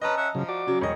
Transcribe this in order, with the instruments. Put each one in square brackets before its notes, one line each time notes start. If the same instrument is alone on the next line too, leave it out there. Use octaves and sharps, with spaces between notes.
[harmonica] C#4 B4 [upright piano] D#5 A5 A#5
[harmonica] C#4 E5 F#5
[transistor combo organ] C#3 F#3 [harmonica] F3
[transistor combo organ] F#4 D5 D6
[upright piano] C#3 F#3
[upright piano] E1 D#5 [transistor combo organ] C#5